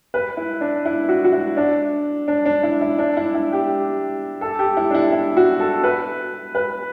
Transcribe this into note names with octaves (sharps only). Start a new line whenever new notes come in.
B4
E4
D4
E4
F#4
F#4
E4
D4
D4
D4
E4
E4
D4
E4
E4
G4
A4
G4
E4
D4
E4
E4
F#4
A4
B4
B4